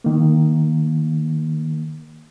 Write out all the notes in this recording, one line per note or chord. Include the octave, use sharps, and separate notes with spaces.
D#3 A#3